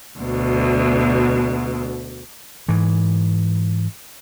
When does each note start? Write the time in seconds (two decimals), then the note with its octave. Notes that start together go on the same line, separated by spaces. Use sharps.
0.19 D2 B2
2.68 G#2 E3